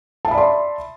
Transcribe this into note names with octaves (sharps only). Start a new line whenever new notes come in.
D5 E5 A5 B5 C6